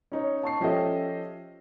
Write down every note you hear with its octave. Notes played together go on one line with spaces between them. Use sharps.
C#4 D#4 C#5
A5 C#6 C7
F3 C#4 G4 A4 D#5 E5